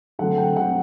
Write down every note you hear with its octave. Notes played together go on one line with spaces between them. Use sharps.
D3 F#3 A3 C4 F#5
G5
D3 F#3 A3 C4 F#5